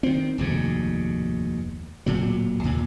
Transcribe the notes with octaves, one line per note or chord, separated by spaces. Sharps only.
D#3 C4
F1 D#2 G#2 B2
D1 A#2 F#3
D#2 A#2